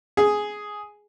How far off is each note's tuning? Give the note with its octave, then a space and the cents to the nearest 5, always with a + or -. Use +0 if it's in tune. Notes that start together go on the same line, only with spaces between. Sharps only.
G#4 +5